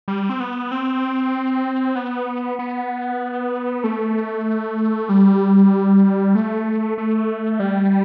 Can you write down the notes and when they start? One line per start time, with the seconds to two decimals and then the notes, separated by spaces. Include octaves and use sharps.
0.08 G3
0.30 C4
0.40 B3
0.71 C4
1.96 B3
2.59 B3
3.84 A3
5.09 G3
6.35 A3
6.98 A3
7.60 G3